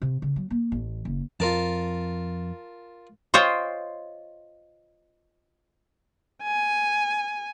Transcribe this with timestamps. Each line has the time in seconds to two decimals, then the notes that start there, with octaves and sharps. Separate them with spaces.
0.02 C3
0.22 C#3
0.36 F#3
0.50 A#3
0.72 A1
1.05 F#1
1.40 F2 F4 A#4 A5
3.34 F4 C5 C#5 D#5 G5
6.43 G#5